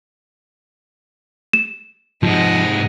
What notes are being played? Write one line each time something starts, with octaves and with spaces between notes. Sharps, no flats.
E7
G#2 C3 F3 D#5 F#5